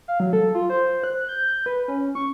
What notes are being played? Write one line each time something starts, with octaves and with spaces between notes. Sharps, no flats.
F5
F#3
A4
F4
C5
F#6
G6
B4
C#4
C#6